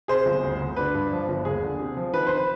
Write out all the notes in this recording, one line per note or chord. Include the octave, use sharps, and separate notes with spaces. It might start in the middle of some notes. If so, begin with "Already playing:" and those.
C3 G#4 C5
G1
D2
D2
D4 B4
G2
F3
G1
D#2 G#4
D3
C3
F3
D#3 B4
C5
B4